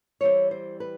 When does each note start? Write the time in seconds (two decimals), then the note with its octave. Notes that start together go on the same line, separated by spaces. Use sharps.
0.21 E3 G3 C4 C#5
0.51 C5
0.80 B4